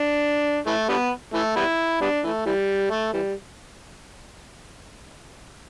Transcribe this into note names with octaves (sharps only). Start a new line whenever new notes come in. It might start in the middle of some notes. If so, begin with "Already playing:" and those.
Already playing: D4
E3 A3
D3 G3 B3
E3 A3
G3 B3 E4
G3 B3 D4
E3 A3
E3 G3
A3
E3 G3